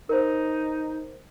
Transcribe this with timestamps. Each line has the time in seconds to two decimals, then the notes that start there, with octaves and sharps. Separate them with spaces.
0.09 D#4 A#4 C5